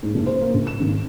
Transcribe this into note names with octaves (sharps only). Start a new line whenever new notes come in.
G#2
F#1
C5
A#3
C#2
E7
G#1